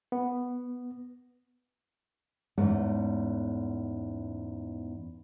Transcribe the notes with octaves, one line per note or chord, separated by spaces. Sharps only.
B3
E2 G#2 A3 C#4